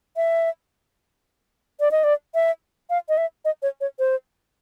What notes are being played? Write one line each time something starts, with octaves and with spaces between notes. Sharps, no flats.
E5
D5
D#5
D5
E5
F5
D#5
E5
D#5
C#5
C#5
C5